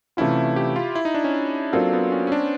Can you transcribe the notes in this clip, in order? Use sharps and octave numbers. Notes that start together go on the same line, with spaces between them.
C3 E3 A3 C#4 E4 F4
G4
F4
E4
D#4
D4
C#4
F#3 A#3 C4 D4 F4 A4
B3
C#4
C#4
D4